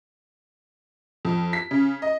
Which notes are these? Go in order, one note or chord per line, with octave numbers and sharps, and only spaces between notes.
F2
B6
C#3
D#5